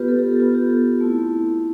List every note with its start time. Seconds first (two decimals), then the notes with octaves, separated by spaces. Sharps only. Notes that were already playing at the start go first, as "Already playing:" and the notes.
Already playing: B3 F4 G4 B4
0.08 A4
0.19 G4
0.29 A4
0.40 B3 F4
0.55 G4
0.70 A4
1.01 A3 C4 E4